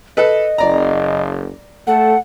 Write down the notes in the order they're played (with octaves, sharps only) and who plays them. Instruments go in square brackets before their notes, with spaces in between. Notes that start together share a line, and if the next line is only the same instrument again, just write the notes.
[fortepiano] A4 B4 [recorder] D#5
[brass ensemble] F#1 [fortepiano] D5 A#5
[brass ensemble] A3 A4 [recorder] F#5